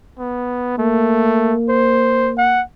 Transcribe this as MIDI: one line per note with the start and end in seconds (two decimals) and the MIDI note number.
0.19 0.78 59
0.78 1.54 57
0.78 2.62 58
1.69 2.31 72
2.38 2.62 78